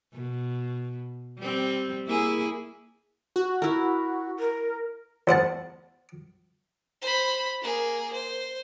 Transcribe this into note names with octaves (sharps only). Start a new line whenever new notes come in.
B2
G3 C4
A#3 E4 G#4
F#4
E4 A#4
A#4
E2 C5 F#5 A5
C5 B5
A#3 G#4
C5